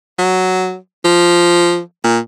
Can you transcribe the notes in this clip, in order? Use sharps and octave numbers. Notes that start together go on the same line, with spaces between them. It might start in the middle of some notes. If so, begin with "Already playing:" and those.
F#3
F3
A#2